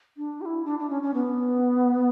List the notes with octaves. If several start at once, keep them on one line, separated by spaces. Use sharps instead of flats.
D4
G4
E4
D4
D4
C#4
C#4
B3